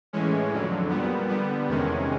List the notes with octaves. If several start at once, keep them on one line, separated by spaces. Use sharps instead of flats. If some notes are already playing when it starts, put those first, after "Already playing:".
A2 E3 G#3 C#4
F2 D3 F#3
A#2 G3 B3
D3 G3 B3
E2 C3 D#3 G#3 C#4